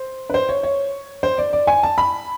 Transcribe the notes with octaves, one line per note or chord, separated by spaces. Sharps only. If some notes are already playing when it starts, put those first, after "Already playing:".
Already playing: C5
B4
C5
C#5
C#5
C5
D5
D5
G#5
A5
B5